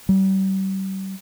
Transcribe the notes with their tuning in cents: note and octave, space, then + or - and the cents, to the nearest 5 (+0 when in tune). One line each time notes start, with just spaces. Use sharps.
G3 -35